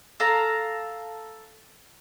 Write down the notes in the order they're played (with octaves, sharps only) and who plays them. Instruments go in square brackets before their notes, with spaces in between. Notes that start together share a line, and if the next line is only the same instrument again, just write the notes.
[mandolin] A4 F5 A#5